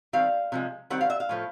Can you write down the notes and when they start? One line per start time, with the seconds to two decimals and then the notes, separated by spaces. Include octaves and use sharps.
0.13 D#3 G3 C4 F5
0.52 C3 F3 G#3
0.90 D#3 G3 C4 F#5
1.01 F5
1.10 E5
1.20 F5
1.29 A2 F3 A3